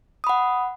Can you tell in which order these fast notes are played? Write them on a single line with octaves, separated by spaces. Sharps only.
D#6 B5 F#5